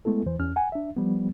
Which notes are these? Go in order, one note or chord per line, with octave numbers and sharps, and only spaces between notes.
G#3 A3 B3 E4 A4
E2 E3 C5
E2 C#4 F6
F#5 G#5
D4 E5
F3 G3 B3